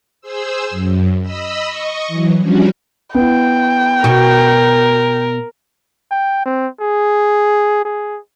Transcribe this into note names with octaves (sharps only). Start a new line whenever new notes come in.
G#4 C5 E6
F#2
D#5 B5 E6
D#5 C#6
E3 F#3
F3 G3 C#4 D4 F#4
B3 E4 G5
B2 F#4 A#4
G5
C4
G#4
G#4